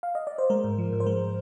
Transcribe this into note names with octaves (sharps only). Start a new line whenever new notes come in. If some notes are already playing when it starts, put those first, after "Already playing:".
F5
D#5
D5
C5
G#3 A#4
G#2
F3
G#2
C5
G#3 A#4